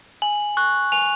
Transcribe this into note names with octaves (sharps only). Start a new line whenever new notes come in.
G#5 F#7
C#6 F#6
G#5 F7